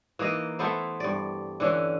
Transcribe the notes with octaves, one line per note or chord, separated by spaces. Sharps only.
E3 A#3 D#4 D#5
A3 B3 E4 C5
G2 D5
D3 E3 C#4